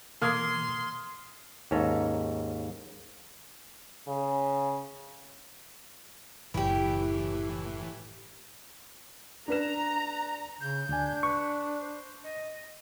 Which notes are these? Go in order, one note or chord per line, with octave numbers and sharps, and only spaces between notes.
B2 E3 A#3 C6 D#6 F6 G#6
D#2 G#2 C#4 A4 A#5
C#3
F#1 A2 E3 E4 G4
D4 B4 A#5 E7
C#3 G6
D2 D4 G#5
B4 C#6
C5
D#5